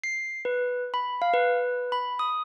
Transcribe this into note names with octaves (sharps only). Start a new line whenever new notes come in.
C7
B4
B5
F5
B4
B5
D#6